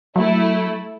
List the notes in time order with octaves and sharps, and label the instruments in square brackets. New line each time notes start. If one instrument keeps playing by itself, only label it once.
[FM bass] F#3 [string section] A3 E4